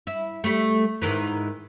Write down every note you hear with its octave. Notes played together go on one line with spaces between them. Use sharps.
E4
G3 A3
G#2 D#3 E3